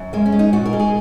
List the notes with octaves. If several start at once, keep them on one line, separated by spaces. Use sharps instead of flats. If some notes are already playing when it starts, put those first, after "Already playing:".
Already playing: F#2
G#3 A#3
C#4
G#3
D#4
A#2 F#4
A#4
G#3
G#4